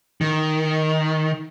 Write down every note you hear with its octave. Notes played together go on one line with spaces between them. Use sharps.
D#3